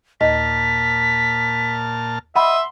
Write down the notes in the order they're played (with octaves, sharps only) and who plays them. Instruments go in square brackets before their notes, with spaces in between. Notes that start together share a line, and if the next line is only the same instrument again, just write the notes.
[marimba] D#2 D#5 [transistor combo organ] A#2 A5 F6 [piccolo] B6
[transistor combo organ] D#5 [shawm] E5 [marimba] F#5 B5 [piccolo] C6